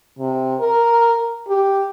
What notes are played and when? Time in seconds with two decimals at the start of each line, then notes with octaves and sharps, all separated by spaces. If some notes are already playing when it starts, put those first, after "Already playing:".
0.19 C3
0.60 A#4
1.48 G4